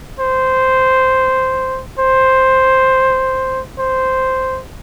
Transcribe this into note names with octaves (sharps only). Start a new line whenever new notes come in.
C5
C5
C5